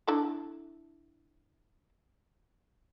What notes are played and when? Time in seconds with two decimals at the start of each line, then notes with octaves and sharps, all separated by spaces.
0.07 D4 E4 A4